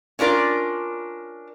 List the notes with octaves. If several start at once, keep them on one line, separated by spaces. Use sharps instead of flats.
C#4 D4 F4 A#4 D5